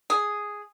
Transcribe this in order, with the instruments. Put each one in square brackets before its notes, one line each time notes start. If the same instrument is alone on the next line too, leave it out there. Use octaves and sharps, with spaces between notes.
[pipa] G#4